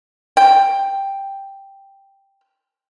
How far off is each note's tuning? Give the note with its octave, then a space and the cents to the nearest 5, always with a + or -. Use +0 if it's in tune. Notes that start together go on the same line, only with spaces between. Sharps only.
G5 +0